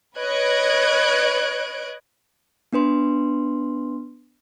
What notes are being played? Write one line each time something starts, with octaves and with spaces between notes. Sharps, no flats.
B4 C#5 D#5 F#6 G#6 D7
B3 D4 B4 C6